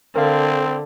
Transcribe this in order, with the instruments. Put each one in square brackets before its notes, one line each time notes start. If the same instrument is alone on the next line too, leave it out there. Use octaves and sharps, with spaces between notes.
[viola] D3 [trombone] C4 [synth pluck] A#4 F5